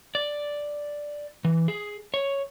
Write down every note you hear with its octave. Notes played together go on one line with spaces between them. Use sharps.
D5
E3
G#4
C#5